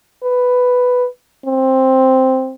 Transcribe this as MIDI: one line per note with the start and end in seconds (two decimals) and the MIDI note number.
0.23 1.07 71
1.46 2.54 60